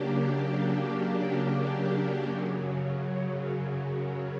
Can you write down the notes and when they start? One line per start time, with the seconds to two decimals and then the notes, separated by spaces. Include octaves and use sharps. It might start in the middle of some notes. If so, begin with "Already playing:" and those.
Already playing: C#3 F#3 A#3 D4 G4
2.26 F#2 C#3 F#3